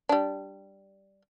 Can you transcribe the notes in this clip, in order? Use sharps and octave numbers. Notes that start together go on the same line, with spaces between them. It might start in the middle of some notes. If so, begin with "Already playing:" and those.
G3 D4